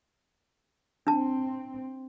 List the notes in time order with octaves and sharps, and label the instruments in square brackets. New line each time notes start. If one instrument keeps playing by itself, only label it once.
[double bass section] C4 [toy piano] D4 A5